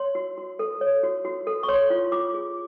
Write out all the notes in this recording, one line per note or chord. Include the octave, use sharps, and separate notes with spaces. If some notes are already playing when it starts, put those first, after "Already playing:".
Already playing: C#5 C6
F#4
F#4
A4
C#5
F#4
F#4
A4
C#6
C#5 C6
F4
F4 D6
G#4